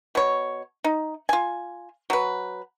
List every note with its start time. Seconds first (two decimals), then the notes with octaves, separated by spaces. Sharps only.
0.15 B2 C#5
0.84 D#4
1.29 F4 G#5
2.10 F#3 B4